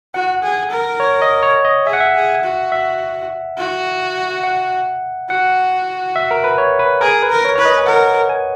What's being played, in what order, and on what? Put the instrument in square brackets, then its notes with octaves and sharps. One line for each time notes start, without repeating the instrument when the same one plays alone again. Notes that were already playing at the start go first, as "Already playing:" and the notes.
[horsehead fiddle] F#4 [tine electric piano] F#5
[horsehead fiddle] G#4
A#4
[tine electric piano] C#5
D#5
C#5
D#5
[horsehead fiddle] G#4 [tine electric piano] E5
[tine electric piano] F#5
E5
[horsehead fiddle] G#4
F#4
[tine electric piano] E5
[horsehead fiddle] F#4
[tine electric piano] F#5
[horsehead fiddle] F#4 [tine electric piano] F#5
[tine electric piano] E5
A#4
B4
C#5
B4
[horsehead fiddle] G#4 [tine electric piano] A#4
[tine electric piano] B4
[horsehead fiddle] A#4
[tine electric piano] C#5
[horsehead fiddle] B4 [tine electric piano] C#5
[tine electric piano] D#5
G#5
[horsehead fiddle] A#4 [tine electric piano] F#5
[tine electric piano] G#5